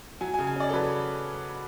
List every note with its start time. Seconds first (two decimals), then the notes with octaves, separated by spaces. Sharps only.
0.21 F#3 G#5
0.34 G#5
0.38 C#3
0.47 G#5
0.56 C#4 D5
0.69 A4
0.73 F#3 B4